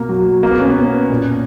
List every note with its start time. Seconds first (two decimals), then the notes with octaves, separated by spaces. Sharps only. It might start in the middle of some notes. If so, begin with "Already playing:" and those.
Already playing: B2 A#3
0.09 F#3
0.43 B2 A#3
0.51 B3
0.59 C#4
0.68 B3
1.10 A#2